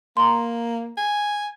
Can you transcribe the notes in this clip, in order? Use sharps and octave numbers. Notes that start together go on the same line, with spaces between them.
A#3 A#5 C6
G#5